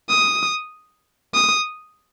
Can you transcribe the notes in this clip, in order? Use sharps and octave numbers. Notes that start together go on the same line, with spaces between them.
D#6
D#6